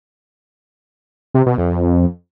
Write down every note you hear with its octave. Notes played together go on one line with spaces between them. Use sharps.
C3
B2
F2